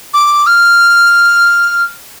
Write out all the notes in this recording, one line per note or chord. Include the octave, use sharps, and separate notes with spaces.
D6
F6